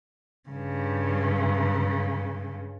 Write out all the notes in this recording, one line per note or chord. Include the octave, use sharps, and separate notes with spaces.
G2 C#3